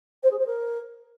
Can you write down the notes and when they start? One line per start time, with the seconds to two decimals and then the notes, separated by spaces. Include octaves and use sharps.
0.23 C5
0.31 G#4
0.39 C5
0.46 A#4